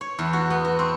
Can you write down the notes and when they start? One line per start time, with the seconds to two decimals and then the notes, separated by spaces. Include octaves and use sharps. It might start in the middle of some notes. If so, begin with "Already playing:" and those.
0.01 C#5
0.19 E2
0.33 F#4
0.50 B3
0.65 F#4
0.79 C4